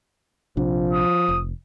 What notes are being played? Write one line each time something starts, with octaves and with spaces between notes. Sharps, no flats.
A#1 C3 F3 D4
D#6
F1